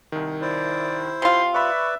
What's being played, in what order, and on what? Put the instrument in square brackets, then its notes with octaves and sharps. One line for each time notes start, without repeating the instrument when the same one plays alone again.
[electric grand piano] C2 D#3
[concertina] E4 C5 [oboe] D5
[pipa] C3 F4 [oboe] C6
[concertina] B4 D5 [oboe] E5 [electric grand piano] B5 C#6